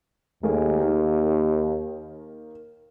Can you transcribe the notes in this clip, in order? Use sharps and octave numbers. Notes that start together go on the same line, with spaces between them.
D#2 A3 A#3 G#4
D#3 A#3